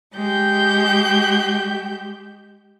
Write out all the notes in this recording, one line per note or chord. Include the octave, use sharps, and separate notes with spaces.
G#3 G4 G6